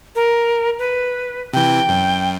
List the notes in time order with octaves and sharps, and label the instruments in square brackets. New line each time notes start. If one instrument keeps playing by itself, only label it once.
[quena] A#4
B4
[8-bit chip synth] C3 E3 [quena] G5
[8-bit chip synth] F#2